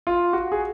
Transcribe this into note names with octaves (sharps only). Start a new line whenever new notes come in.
F4
F#4
G#4